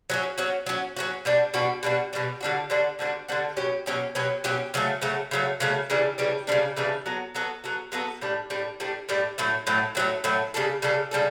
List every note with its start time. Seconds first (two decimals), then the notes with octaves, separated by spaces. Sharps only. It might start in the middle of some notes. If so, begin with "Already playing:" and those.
0.10 F#3 C#4 F#4
0.38 F#3 C#4 F#4
0.66 F#3 C#4 F#4
0.97 F#3 C#4 F#4
1.25 B2 G3 D4 F#4
1.54 B2 G3 D4 F#4
1.83 B2 G3 D4 F#4
2.13 B2 G3 D4 F#4
2.41 D3 G3 D4 F#4
2.70 D3 G3 D4 F#4
2.99 D3 G3 D4 F#4
3.28 D3 G3 D4 F#4
3.57 B2 F#3 C#4 G4
3.86 B2 F#3 C#4 G4
4.15 B2 F#3 C#4 G4
4.44 B2 F#3 C#4 G4
4.74 C#3 F#3 A3
5.02 C#3 F#3 A3
5.31 C#3 F#3 A3
5.60 C#3 F#3 A3
5.90 C#3 E3 G3 D4
6.18 C#3 E3 G3 D4
6.47 C#3 E3 G3 D4
6.77 C#3 E3 G3 D4
7.06 F#3 B3 F#4 A4
7.35 F#3 B3 F#4 A4
7.64 F#3 B3 F#4 A4
7.92 F#3 B3 F#4 A4
8.21 A2 G3 D4
8.50 A2 G3 D4
8.80 A2 G3 D4
9.09 A2 G3 D4
9.38 A2 F#3 A3
9.67 A2 F#3 A3
9.95 A2 F#3 A3
10.24 A2 F#3 A3
10.54 C#3 G3 D4 A4
10.82 C#3 G3 D4 A4
11.11 C#3 G3 D4 A4